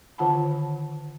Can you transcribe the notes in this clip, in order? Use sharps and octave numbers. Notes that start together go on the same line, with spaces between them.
D3 D#3 F4 F#5 A5 B5